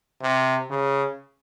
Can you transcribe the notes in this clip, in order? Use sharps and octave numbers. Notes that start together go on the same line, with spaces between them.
C3
C#3